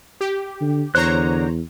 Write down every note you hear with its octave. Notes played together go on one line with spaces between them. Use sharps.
G4
D3
E2 D3 C5 C#5 A#5 F#6